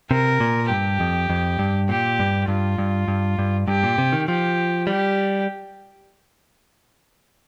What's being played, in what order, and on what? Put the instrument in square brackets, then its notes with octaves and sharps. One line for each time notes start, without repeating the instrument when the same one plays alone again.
[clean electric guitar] C3 [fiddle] A#4
[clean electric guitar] A#2
[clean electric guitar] G2 [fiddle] G4
[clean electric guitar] F2
F2
G2
[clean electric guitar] A#2 [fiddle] G4
[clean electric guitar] G2
[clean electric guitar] G2 [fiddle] F4
[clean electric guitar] G2
G2
G2
[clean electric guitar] G2 [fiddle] G4
[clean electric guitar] A#2
C3
D#3
[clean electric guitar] F3 [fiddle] G4
[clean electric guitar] G3 [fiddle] G4